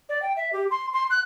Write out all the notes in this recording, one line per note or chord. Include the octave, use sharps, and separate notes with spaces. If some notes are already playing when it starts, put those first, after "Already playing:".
D5
G5
E5
G4
C6
C6
F#6